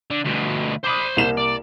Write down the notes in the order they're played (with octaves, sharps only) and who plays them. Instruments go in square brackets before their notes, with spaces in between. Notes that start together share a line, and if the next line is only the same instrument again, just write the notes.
[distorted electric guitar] D3
D2 B2
[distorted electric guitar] C5 B5 [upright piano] D6 D#6
[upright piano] C2 A#3 E7
[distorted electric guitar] D5